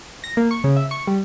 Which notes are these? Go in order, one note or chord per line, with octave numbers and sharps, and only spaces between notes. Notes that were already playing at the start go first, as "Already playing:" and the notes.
A#6
A#3
C#6
C#3
E5
C#6
G3